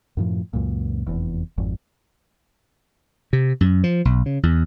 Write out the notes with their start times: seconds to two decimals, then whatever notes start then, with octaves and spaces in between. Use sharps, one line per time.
0.17 F#2 A2 F3
0.53 C#2 F#2 A#2
1.07 F1 E2
1.58 G#1 F2
3.33 C3
3.61 F#2
3.84 F3
4.05 B1
4.26 C#3
4.43 E2